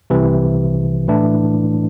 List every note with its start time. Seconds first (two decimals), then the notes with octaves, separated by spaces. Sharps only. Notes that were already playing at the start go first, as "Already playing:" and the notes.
0.10 C2 C3 E3
1.08 A2 E3 A3 D4